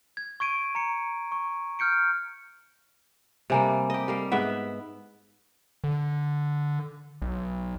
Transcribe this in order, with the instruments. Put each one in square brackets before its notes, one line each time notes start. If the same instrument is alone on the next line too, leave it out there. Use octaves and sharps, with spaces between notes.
[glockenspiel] G#6
C#6 G#6 D7 D#7
A#5 C#7
C#6
F6 G6 C#7 D7
[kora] C3 G3 A#3 [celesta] C5 G#5 A#5
[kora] G4 D#5
G3 A#4 F5
[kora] G#2 B3 E5 [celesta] F#5
[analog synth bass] D3
B1